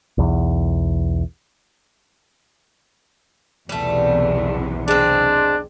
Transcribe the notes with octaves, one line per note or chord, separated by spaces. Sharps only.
B1 E2
B1 E2 C3 G3 A3
G#3 C4 D4